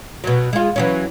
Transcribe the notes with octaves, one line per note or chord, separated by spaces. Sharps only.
B2 F#3
G#3 F4
E3 F#3 C#4